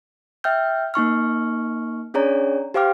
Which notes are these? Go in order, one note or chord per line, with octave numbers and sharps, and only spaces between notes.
E5 G5 F6 G6
A#3 D#4 C#6 F6
C#4 D4 G#4 C#5 D5 A#5
G4 C5 F5 G5 D6 F6